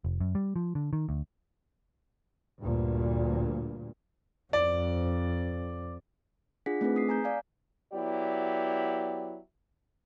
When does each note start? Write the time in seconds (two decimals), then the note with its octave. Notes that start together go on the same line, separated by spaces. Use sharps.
0.04 F1
0.20 F#2
0.35 G3
0.56 F3
0.75 D3
0.93 D#3
1.09 D2
2.61 D2 G2 A#2
4.53 F2 D5
6.66 D4 F4 G#4 F#5 B6
6.81 A3 C4 D#4 G#4 B4
6.96 D#6 B6 C7
7.09 G#5 A#5 G6
7.24 D5 F5 G#5
7.93 F#3 B3 E4 G4 D5